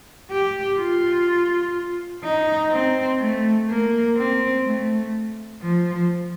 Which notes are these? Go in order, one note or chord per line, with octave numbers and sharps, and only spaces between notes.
G4
F4
D#4
C4
A3
A#3
C4
A3
F3